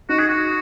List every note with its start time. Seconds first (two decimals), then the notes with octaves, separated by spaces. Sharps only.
0.09 D#4 F#4
0.19 G#4
0.28 F#4